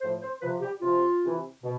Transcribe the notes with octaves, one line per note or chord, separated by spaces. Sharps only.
A2 F3 C5
C5
C3 F3 B4
G4
C3 F3 F4
C3 E3
B2